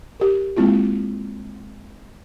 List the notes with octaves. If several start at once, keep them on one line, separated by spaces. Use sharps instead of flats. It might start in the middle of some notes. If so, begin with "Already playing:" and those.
G4 A#4
G#3 A#3 C4 E4 F4